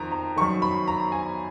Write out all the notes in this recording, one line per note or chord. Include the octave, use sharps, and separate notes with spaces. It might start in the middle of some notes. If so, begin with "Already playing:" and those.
Already playing: F2 D#3 A#5
A#5
F#2 D#3 C#6
B5
A#5
G#5